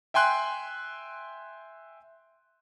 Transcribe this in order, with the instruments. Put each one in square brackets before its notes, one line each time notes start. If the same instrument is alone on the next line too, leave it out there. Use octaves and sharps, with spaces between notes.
[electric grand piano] E5 G5 G#5 C6 F#6 G6